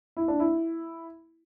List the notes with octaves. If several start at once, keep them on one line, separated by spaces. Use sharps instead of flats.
E4
D4
E4